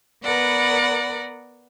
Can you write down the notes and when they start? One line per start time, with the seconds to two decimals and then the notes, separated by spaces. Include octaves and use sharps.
0.24 B3 A#4 B4 D5 F#5